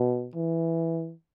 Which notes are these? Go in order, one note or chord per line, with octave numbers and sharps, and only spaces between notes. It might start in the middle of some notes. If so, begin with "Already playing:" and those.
Already playing: B2
E3